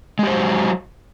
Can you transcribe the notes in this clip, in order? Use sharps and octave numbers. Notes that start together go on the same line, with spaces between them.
F#3 G#3 G4 C5